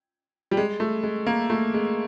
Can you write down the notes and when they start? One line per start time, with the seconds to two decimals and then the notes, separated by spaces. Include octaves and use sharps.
0.51 G3
0.57 G#3
0.80 A3
1.03 G#3
1.26 A#3
1.50 A3
1.74 G#3